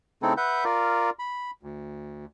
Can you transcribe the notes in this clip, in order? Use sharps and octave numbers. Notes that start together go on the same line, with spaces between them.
C#3 A3 C4 D#4 E4 A4
B4 E5 F#5 G6
F4 A#4 D5
B5
D2